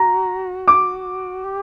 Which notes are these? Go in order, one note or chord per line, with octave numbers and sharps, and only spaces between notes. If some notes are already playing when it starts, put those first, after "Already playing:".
Already playing: F#4 A#5
D6
G4